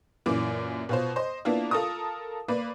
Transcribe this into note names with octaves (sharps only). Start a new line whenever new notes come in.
F#2 A#2 E3 D6
B2 F4 C5
C5 D#5 C6
A#3 B3 D4 E4 F4
F4 A4 A#4 D#6
A#3 B4 D5